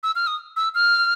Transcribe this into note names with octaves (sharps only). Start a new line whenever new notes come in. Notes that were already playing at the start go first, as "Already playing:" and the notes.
E6
F6
D#6
E6
F6